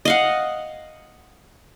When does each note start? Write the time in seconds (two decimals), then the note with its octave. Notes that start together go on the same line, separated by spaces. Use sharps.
0.05 D#5 F5 F#5